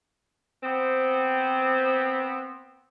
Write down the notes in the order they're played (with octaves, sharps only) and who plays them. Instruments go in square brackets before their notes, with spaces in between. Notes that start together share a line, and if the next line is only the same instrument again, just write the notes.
[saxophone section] B3 C4